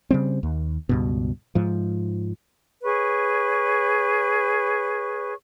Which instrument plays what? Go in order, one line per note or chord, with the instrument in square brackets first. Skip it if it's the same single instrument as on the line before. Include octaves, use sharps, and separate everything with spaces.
[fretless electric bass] C#3 G3 C4
D#2
C#2 G2 B2
G#2 F3
[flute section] G#4 B4 C#5 C#6